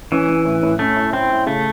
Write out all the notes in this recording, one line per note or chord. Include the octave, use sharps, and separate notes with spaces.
E3 C#4
C#4
A2
A2
A3 C#4
E4
C4 E4
E4
C#3 A3